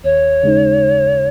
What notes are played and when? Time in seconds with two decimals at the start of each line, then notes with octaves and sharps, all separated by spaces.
0.04 D#2 C#5
0.43 C#3 G#3 D#4